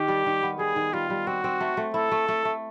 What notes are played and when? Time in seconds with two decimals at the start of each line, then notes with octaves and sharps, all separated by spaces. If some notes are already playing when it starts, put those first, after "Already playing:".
Already playing: D#3 G4
0.08 G3
0.26 D#3
0.43 B3
0.59 G3 G#4
0.76 D#3
0.93 G3 F4
1.10 G3
1.27 C4 F#4
1.44 C4
1.61 A3
1.77 A3
1.94 E4 A4
2.12 A3
2.28 A3
2.45 A3